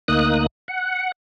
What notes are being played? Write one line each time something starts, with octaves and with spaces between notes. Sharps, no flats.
D2 A#3 D#4 D#6 F#6
F#5